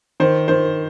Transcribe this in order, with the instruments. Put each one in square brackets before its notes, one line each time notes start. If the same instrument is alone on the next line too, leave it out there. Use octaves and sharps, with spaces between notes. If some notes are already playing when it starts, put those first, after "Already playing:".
[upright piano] D#3 C5
D#3 C5